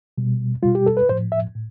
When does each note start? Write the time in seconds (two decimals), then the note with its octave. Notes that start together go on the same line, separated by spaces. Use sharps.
0.18 B2 G3
0.63 B2 G3 F4
0.75 G4
0.86 A4
0.97 B4
1.09 A2 F3 C5
1.32 E5
1.55 A2